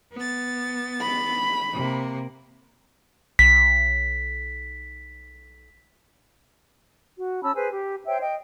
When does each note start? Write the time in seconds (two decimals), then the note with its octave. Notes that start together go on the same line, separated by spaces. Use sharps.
0.13 B3 A6
1.02 B5
1.74 C3 A#3
3.39 B1 B6
7.18 F#4
7.42 C#4 A5 B5 E6
7.55 G#4 B4 C5 G#5
7.71 G4
8.06 C5 C#5 E5 G5
8.21 D#5 G5